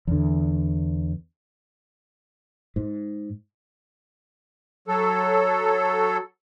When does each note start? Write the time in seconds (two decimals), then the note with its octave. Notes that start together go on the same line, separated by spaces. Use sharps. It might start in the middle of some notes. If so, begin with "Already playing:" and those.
0.07 E2 D3
2.76 G#2
4.88 F#3 A4